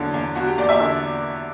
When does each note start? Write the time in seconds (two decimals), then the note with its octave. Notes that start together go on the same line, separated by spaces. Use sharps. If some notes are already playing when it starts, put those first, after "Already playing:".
Already playing: E2 D3 F#3 E4
0.14 E2
0.35 E2 F#4
0.47 G4
0.57 E2 D5
0.69 E5
0.80 D3 E5